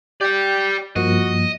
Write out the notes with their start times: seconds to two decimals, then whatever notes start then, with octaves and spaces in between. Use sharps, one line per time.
0.21 G4 D5 G5
0.96 G2 F3 A#3 F#4 D#5